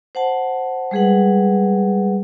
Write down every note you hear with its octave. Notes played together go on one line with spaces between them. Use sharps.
C5 F#5 A5
G3 G#3 G#4 B4 F#5